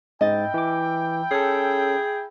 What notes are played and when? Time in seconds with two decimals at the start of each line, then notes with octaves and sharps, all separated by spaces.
0.21 G#2 E4 D#5 G5 A6
0.54 E3 D6
1.31 C#4 G#4 A4